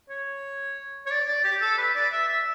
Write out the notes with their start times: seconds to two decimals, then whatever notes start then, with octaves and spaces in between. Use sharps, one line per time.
0.10 C#5
1.06 C#5
1.11 D5
1.28 D5
1.44 G4
1.62 A4
1.78 B4
1.95 D5
2.12 E5
2.28 E5